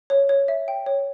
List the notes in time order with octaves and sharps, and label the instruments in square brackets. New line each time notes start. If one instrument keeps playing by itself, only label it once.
[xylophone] C#5
C#5
E5
G5
C#5